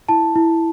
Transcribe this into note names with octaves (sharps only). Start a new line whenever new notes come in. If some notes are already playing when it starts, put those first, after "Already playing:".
E4 A5
E4